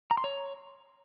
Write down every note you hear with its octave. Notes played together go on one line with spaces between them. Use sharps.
A#5
C6
C#5